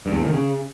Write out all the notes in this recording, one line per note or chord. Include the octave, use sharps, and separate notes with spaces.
G2
E2
A2
D#3
C#3